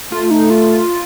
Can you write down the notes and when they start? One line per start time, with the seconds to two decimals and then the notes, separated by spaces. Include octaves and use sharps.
0.12 A3 F4
0.31 D#4
0.50 F4